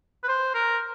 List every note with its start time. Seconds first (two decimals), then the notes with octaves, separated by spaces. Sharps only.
0.24 B4
0.28 C5
0.54 A#4